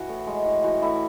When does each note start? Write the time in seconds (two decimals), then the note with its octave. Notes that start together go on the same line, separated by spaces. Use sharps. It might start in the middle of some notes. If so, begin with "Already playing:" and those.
Already playing: E3 F#4
0.09 A2
0.27 G#3
0.46 A2
0.64 E3 F#4
0.82 A2 E4